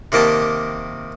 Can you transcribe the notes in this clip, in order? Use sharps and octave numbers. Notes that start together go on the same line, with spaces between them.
C3 D#3 A#3 G4 A5